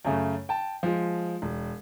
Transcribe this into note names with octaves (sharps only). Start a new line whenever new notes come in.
F#2 C#3 A3
G5 A5
F3 G#3
E1